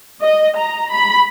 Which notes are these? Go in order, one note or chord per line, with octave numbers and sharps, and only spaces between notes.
D#5
A#5
B5